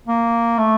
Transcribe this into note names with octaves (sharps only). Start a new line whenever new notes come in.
A#3
A3